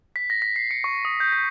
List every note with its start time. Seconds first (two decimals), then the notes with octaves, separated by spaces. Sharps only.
0.16 B6
0.30 A#6
0.42 B6
0.56 C7
0.71 C#7
0.84 C#6
1.05 D#6
1.20 G6
1.32 B6